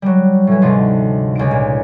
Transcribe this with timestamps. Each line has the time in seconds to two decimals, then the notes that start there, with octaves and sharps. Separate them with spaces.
0.02 F#3 G3
0.47 A2 E3
0.61 D2 G#2 C3 F3 G3
1.35 C#2 D#4 D7
1.51 A#2